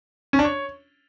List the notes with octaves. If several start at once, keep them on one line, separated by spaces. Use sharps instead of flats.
C#4
D4
C#5